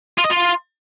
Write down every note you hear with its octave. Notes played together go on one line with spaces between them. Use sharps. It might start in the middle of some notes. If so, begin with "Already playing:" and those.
F4
D#5
F4